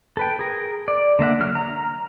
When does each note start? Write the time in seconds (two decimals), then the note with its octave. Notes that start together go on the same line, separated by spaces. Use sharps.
0.17 A4 B4 G5
0.39 G#4 A#4
0.88 D5
1.19 D3 A#3 E5 F#5
1.40 D3 F#3 F6
1.55 A#5